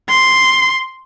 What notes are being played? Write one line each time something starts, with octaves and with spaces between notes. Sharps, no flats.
C6